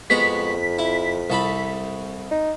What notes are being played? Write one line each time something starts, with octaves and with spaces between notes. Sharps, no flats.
F2 G#3 B3 F#4 B6
E4
C2 A4 B5
D#4